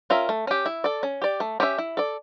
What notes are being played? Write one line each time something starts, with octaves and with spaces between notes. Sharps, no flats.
C#4 F4 A#4 E5
A3
C#4 G4
E4
A4 D5
C#4
G4 D5
A3
C#4 G4 C#5 E5
E4
A4 D5